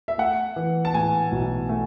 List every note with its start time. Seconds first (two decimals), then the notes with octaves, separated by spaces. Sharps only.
0.08 E5
0.18 A3 F#5
0.56 E3
0.85 A5
0.94 A2 G#5
1.32 B1
1.69 A3